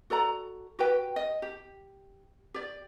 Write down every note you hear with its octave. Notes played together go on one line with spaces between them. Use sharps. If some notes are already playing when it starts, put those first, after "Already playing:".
F#4 A4 D5 A#5
F#4 G4 B4 G5
D#5
G4
G4 D5